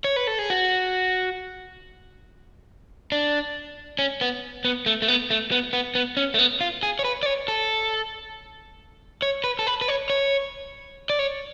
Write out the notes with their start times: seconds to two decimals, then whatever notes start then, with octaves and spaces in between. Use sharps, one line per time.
0.04 C#5
0.16 B4
0.27 A4
0.39 G#4
0.50 F#4
3.12 D4
3.99 C#4
4.21 B3
4.65 B3
4.86 A3
5.02 A3
5.08 B3
5.30 A3
5.52 B3
5.73 B3
5.95 B3
6.17 C#4
6.34 A3
6.39 B3
6.61 F4
6.83 G#4
6.99 C#5
7.04 B4
7.23 D5
7.26 C#5
7.48 A4
9.22 C#5
9.44 B4
9.59 A4
9.67 B4
9.81 B4
9.88 C#5
10.10 C#5
11.10 D5
11.19 C#5